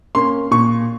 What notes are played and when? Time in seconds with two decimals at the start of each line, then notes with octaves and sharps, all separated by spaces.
0.15 A#3 C#4 C6
0.51 A#2 C#6